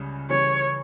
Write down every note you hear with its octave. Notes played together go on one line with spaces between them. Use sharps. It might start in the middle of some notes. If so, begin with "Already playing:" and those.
Already playing: C#2 C#3 G3 C#4
C#3 E3 G3 C#5